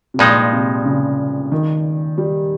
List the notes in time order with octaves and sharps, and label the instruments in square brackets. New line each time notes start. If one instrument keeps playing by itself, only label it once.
[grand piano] C3
[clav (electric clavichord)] G2 F3 G#3 D#4 [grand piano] A#2
[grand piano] C3
C#3
D#3
G3